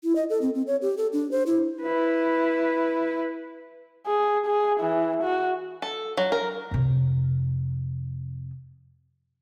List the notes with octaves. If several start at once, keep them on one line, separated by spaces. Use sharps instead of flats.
E4
D#5
A4
C4
C4
C#5
G4
A4
D4
C5
E4
E4 B4
G#4
G#4
E3
F#4
A4
F#3
A#4
F2 C3